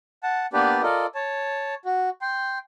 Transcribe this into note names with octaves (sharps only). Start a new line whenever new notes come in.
F#5 A5
A#3 B3 D4 G4 B4 D5
F4 A4 A#4 D5 D#5
C#5 A5
F#4
G5 C6